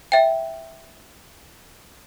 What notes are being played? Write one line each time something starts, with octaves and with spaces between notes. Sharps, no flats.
E5 G5